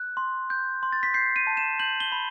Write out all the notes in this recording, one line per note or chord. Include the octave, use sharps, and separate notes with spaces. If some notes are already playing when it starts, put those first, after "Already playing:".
Already playing: F#6
C6
G6
C6
A6
B6
G6 C7
D#7
A5
E7
G6 F#7
G7
B5